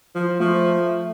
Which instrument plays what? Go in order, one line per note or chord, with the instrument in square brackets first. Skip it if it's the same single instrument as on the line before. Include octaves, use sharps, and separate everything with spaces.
[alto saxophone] F3
[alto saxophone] F3 [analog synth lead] A3